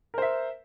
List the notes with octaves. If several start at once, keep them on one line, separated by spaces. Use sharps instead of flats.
A#4 C5 E5